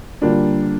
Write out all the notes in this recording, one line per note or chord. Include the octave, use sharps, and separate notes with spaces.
D3 G3 A#3 D4 F4